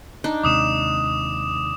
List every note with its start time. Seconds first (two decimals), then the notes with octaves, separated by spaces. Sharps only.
0.24 D4 D#4
0.43 D#2 C3 G#3 D6 D#6 E7